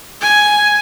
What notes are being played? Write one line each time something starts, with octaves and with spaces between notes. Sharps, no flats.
G#5